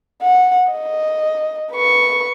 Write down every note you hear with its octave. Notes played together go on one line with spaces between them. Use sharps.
F#5
D#5
B4 C#6